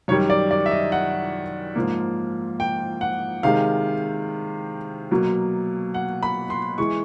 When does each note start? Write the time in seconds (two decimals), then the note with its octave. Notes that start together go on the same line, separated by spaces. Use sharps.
0.08 F#2 D#3 G3 C#5
0.30 D5
0.51 D5
0.66 E5
0.71 D#5
0.92 F#5
1.76 G#2 F3 A#3
2.60 G5
3.01 F#5
3.43 C3 D#3 G#3 F5
5.11 B2 F#3 A#3
5.94 F#5
6.23 B5
6.50 C6
6.78 E3 G#3 C#6